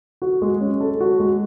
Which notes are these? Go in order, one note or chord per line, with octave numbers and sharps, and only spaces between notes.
F#4
G#3
C#4
A4
F#4
G#3